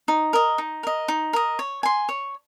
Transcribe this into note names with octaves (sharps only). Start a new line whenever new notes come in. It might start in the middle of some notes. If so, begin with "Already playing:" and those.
D#4
A#4 D#5
D#4
A#4 D#5
D#4
A#4 D#5
C#5
G#5 C6
C#5